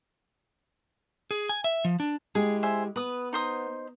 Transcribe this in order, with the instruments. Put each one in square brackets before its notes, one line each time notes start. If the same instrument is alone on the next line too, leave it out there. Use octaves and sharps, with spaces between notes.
[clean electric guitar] G#4
G#5
E5
F3
D4
[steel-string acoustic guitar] G#3 E4 G4 [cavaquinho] G#4
[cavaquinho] C5 E5 G#5
[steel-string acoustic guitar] B3 [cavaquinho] B4 D#6
[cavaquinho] D#4 C5 D#6